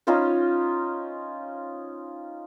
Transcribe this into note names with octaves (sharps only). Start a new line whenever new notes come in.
C#4 D#4 F4 C5